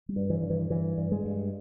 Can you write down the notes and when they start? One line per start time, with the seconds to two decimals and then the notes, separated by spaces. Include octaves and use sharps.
0.09 G3
0.16 G2
0.30 E3
0.43 G2
0.50 E3
0.70 G2 E3
0.98 G2
1.12 G#3
1.25 G2